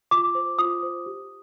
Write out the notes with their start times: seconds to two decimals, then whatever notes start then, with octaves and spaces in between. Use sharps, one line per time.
0.11 F4 D6
0.35 C5
0.59 F4 D#6
0.83 C5
1.06 G4